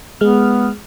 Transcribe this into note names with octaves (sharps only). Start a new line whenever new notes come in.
G#3 B3 F6